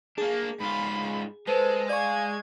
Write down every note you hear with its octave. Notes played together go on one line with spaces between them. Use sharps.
A#3 D4 G#4
G#2 F4 B5
G#3 A4 B4 C5
D5 F5 G#5 C#6 G#6